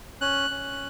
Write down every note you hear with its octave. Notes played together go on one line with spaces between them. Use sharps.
C#4 F#6
C#4